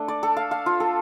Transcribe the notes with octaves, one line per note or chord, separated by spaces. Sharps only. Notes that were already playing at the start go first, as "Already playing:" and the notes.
Already playing: A3 D4
D5
A4
F5
F5
F4
A4